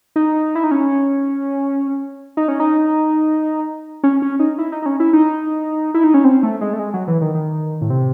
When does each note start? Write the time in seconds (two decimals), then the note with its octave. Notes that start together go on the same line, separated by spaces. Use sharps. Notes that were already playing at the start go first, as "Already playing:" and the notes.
0.16 D#4
0.55 E4
0.64 D#4
0.71 C#4
2.37 D#4
2.48 C#4
2.60 D#4
4.04 C#4
4.22 C#4
4.40 D#4
4.59 E4
4.72 D#4
4.82 D#4
4.86 C#4
5.00 E4
5.13 D#4
5.94 E4
6.04 D#4
6.14 C#4
6.24 C4
6.43 A3
6.61 G#3
6.73 A3
6.79 G#3
6.94 F#3
7.08 E3
7.21 D#3
7.35 D#3
7.81 A2
7.90 C3